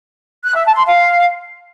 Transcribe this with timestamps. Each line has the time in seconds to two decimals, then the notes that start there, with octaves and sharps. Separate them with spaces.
0.45 F#6
0.55 E5
0.66 A5
0.76 C6
0.86 F5